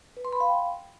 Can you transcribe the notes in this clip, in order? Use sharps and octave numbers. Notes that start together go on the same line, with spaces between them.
B4
C6
B5
F5
G5